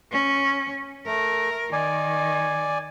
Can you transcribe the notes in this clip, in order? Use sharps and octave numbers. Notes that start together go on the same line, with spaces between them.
C#4
A3 A#4
D#3 D5 G#5